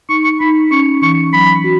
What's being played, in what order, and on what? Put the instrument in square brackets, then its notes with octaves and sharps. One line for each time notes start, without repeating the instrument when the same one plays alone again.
[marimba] D#4 [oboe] C#6
[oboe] C#6
[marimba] D#4 [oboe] B5
[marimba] C#4 [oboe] C#6
[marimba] E3 [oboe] C#6
[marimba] F#3 [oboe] B5
[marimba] F#4